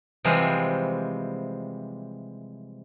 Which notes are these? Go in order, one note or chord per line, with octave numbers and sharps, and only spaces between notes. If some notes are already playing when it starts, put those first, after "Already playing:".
C3 E3 F3 G3 G#3